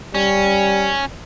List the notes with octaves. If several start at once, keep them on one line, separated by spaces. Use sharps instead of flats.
G3 C#4